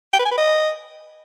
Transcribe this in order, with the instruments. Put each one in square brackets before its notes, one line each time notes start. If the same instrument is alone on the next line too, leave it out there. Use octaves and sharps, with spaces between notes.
[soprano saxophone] G5
B4
G#5
B4
D#5